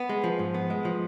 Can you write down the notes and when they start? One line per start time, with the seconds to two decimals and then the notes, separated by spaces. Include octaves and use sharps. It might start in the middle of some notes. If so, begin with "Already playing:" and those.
Already playing: B3
0.09 G#3
0.24 F3
0.39 G#2
0.54 B3
0.70 G#3
0.85 F3